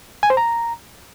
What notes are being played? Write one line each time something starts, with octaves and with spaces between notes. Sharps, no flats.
G#5
C5
A#5